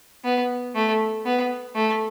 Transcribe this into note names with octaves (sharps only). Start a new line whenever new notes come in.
B3
A3
B3
A3